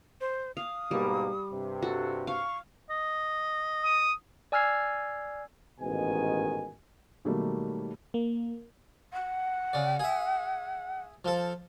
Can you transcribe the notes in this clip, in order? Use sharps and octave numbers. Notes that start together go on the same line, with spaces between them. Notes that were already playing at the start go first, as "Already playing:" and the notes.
C5
F5 D#6
G#2 B2 G3 A#3
G2 C3
F#4 A4
F5 C#6
D#5
D#6
D5 G#5 E6 F6 G#6 C7
A1 G#2 B2 D#3 G#5
B2 D#3 F#3 G3 A3 A#3
A#3
F#5
C#3 D5
G#4 E5
F3 A4